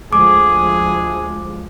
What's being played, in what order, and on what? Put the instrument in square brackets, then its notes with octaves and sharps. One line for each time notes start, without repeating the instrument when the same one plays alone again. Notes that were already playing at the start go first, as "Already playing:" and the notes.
[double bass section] D2 F3 G#3 [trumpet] G#4 [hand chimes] D6